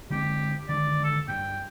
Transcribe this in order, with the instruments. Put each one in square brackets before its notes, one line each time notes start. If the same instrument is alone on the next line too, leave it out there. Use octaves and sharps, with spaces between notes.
[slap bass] D3 G#3 C4 [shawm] G4
[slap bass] D3 D#3 G#3 [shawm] D5
[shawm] A4
[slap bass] G2 [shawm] G5